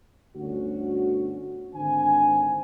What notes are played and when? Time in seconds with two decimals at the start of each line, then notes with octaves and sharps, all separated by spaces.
0.36 G1 D2 C#4 F#4
1.74 G#1 D3 C5 G#5